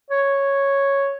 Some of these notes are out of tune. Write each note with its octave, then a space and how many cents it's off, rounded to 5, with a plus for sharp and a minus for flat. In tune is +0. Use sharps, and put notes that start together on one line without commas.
C#5 -5